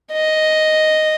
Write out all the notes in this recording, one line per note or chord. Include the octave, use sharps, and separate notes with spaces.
D#5